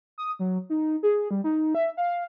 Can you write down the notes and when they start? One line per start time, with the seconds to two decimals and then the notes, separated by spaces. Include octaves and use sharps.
0.18 D#6
0.39 F#3
0.70 D#4
1.03 G#4
1.31 G3
1.44 D#4
1.75 E5
1.97 F5